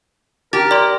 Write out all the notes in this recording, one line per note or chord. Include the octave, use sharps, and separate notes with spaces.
G4 A#4 A6
D5 C6